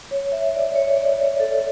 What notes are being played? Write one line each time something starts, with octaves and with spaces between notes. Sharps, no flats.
C#5
E5
D5
C#5
D5
C#5
A4